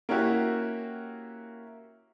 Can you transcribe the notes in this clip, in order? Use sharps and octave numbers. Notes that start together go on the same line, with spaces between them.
A#3 C#4 E4 F#4 G4